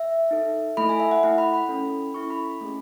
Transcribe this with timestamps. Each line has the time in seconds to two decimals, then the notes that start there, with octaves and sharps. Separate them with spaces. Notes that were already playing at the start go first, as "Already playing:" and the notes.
Already playing: E5
0.31 D#4 A4
0.77 A3 E4 A4 B5
0.89 G#5
1.00 E5
1.11 F#5
1.23 A3 E4 A4 F#5
1.38 B5
1.54 B5
1.69 C#4 E4 A4
2.14 C#4 E4 A4 C#6
2.30 B5
2.61 A3 C#4 E4 G#4